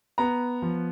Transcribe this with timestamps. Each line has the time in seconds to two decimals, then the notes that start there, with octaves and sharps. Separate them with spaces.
0.18 B3 A#5
0.62 F3